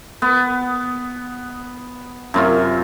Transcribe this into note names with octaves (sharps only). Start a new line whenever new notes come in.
B3
F#2 C3 F4